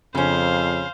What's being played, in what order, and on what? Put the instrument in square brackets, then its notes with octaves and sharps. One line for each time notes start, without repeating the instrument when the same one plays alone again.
[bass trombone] F2 [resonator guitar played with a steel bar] C#3 C#4 [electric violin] C5 F5